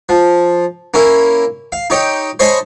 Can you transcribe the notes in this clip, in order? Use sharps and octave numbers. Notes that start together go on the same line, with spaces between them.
F3
A#3 C#4 E4
F5
D#4 G4 C#5 G5
C5 C#5 D#5 G#5 A5 B5